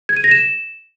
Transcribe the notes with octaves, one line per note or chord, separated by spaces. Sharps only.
G#6
D#7
A#6
E7